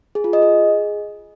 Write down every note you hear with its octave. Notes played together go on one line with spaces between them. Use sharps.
G#4
F4
D#5
G#4